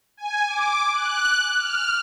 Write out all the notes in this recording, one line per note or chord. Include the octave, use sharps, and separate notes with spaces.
G#5
D6
F#6
F6